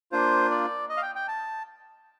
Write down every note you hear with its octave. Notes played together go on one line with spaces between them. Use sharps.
A#3 D4 F4 C5
D5
D#5
F5
G5
G5
A5